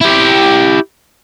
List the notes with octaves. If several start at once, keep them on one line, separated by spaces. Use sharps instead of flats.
E4 G4